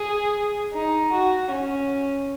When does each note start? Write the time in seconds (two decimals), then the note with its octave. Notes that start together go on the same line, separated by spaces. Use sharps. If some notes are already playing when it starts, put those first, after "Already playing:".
Already playing: G#4
0.73 D#4
1.12 F#4
1.51 C#4